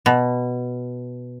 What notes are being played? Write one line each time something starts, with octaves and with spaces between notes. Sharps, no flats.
B2